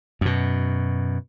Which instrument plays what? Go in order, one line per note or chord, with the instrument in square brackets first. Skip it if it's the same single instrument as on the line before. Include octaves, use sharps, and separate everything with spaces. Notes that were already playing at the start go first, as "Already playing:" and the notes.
[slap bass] F#2 B2